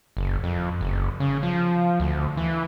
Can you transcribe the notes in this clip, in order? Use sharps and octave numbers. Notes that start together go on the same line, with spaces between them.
F#1
F2
F#1
C#3
F3
D2
E3